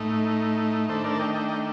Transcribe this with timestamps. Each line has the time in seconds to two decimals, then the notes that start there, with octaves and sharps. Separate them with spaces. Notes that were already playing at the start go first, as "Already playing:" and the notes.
Already playing: A2 A3 D#4
0.89 D#3 A3 D4 A4 C5
1.04 A#4 D5
1.13 A5
1.19 D#5 G5
1.34 D#5 G5
1.48 D#5 G5